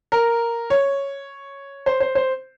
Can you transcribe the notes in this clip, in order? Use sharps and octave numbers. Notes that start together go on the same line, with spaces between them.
A#4
C#5
C5
C5
C5